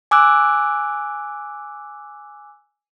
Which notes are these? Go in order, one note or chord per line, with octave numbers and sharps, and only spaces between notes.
G#5 D6 E6 F#6